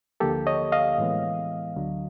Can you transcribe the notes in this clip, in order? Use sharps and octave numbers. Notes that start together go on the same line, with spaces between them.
D2 D3 F3 A#3 G4 A4
C#5 D#5
D#5 F5
A2 E3 G#3 B3
D2 D3 F#3